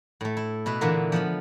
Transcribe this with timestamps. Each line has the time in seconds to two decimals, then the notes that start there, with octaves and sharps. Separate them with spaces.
0.21 A2 A3
0.37 E4
0.66 B2 E4 B4
0.81 A#2 D3 E3 A#3 B3
1.12 F3 B3 B5